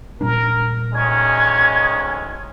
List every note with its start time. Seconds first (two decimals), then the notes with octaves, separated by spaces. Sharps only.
0.21 A#2 G3 D4 A#4
0.94 D2 D#3 G#3 C#4 G#6